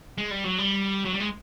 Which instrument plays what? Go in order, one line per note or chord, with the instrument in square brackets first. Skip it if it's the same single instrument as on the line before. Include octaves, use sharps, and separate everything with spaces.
[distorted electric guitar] G#3
G3
F#3
G3
F#3
G3
G#3